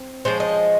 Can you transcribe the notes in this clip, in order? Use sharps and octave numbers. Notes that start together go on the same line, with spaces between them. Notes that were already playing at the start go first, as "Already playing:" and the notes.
Already playing: C4
F3 G#3 C#4 C5
D#5